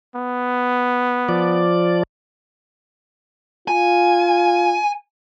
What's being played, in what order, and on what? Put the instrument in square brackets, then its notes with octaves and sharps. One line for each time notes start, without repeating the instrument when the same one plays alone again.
[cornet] B3
[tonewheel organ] F3 D5
[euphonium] F4 [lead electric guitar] G#5